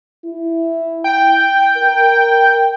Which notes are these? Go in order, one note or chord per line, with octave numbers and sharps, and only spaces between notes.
E4
G5
A#4